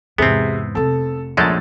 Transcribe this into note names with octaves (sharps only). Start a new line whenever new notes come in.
E2 G#2 C3 B3 C4 G#4
F1 C3 A4
A#1 F#2 G#3 A3 A6